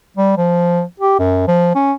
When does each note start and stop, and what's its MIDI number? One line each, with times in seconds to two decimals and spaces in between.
0.17 0.37 55
0.37 0.82 53
1.00 1.18 67
1.19 1.46 42
1.48 1.74 53
1.75 1.93 61